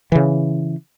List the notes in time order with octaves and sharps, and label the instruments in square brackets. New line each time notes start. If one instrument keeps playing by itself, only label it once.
[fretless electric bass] C#3 E3